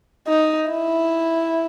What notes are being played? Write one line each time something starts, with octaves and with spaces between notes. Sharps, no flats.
D#4
E4